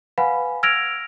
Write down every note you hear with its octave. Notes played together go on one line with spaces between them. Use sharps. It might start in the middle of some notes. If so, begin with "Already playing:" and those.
B4 F5 F#5 G#5 B5
E6 F6 G#6 A#6 D7 F7